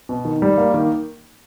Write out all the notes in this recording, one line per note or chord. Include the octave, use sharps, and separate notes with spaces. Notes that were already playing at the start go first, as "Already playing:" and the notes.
B2
D#3
G3
A#3
D#3